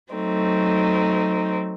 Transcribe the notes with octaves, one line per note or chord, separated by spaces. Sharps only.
F#3 A3 C4 D#4